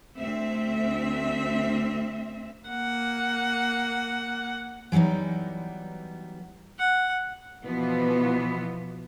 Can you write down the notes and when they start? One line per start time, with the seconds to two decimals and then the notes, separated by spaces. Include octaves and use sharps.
0.19 D2 C4 E5
2.68 A#3 F#5
4.92 E3 F#3 G3 B3 D#4
6.79 F#5
7.65 B2 E3 F3 B3